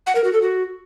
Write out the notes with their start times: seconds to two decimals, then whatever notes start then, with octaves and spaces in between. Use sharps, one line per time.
0.07 F#5
0.15 A#4
0.24 F#4
0.33 A4
0.42 F#4